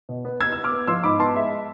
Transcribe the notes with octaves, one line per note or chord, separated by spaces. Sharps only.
B2
B3
B3 E6 G#6
B3 E6
D6 F6
B3
F3 C6 E6
G#2 B5 D6
B3 A5 C6
G#3 E5